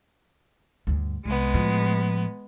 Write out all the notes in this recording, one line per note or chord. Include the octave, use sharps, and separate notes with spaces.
D2 G2
C2 G#3 B3
A2 F3